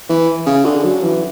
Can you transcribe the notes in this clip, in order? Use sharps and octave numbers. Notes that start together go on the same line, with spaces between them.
E3
C#3
D3
F#3
E3